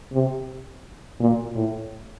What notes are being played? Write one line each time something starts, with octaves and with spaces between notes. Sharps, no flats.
C3
A#2
A2